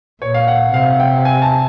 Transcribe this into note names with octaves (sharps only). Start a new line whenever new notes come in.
A#2 C#5
F5
F#5
C3 F5
G5
G#5
A5